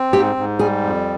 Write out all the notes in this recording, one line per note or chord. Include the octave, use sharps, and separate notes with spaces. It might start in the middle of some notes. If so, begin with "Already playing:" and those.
Already playing: C4
G#2 G4
G#2
G3 G#4
F2